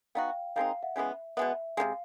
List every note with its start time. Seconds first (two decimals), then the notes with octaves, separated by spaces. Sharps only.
0.15 B3 D#4 F#4 F5 G5
0.56 D#3 G#3 C4 D#4 F5 G5
0.70 F5
0.83 E5 F#5
0.96 C#3 E3 G#3 B3 E5
1.37 B2 G#3 B3 E5
1.77 C3 D#3 G#3 F5